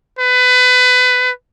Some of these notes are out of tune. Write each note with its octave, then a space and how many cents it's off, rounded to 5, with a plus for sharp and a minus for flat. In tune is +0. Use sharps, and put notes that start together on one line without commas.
B4 +25